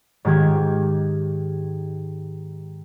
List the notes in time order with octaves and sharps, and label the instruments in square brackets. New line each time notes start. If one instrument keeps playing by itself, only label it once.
[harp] G#2 D#3 G4 G#6